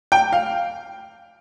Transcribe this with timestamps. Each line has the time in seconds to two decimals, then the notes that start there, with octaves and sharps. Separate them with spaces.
0.12 G5
0.32 F5